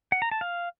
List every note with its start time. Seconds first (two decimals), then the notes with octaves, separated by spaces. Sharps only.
0.12 F#5
0.22 A#5
0.31 A5
0.41 F5